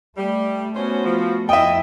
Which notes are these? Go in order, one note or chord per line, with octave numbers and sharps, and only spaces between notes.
G3 A3
B3 C#4 F#4 C5
F3
F2 E4 A4 D#5 E5 G5